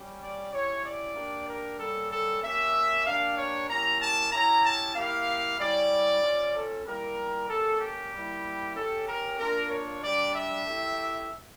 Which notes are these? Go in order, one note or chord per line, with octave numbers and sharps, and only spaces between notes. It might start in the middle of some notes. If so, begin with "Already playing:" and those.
Already playing: G3 C#4 G4
D5
C#4 E4 G4 C#5
D5
A#3 D4 G4
A#4
G3 A#3 C#4 A4
A4
A#3 C#4 G4 E5
A#3 D4 G4 F5
C#5
A#3 C#4 E4 G4 A#5
A5
C#4 E4 G4 A#5
A5
A#3 E4 G4 F5
G3 C#4 E4 G4 D5
C#4 F4
A4
G3 A#3 E4 G4 A#4
A#3 C#4 G4 A4
G4
G3 A#3 E4
C#4 G4 A4
A#4
A#3 D4 F4 A#4
C#5
G3 D4 G4 D5
E5
A3 E4 G4